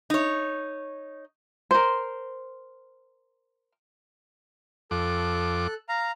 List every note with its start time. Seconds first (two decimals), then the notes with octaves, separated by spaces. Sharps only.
0.10 D#4 C#5
1.71 A#4 C5
4.91 F2 A4 D6 F#6
5.89 F5 A#5